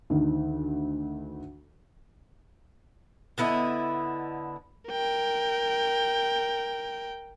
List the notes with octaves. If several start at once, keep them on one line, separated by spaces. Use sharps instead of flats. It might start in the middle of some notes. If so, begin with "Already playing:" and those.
D2 D#3
D3 B3 E4 D#5
A#4 G5